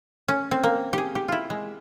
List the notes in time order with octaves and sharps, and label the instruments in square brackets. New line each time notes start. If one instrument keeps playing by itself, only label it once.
[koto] C#4
C4
A#3
G4 G#4
G4
E4 F4
G#3